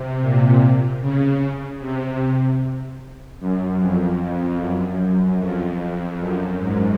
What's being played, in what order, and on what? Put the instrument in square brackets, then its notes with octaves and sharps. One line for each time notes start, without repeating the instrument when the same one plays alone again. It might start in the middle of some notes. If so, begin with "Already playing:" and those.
Already playing: [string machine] C3
A#2
C#3
C3
F#2
F2
F#2
F2
F#2
G#2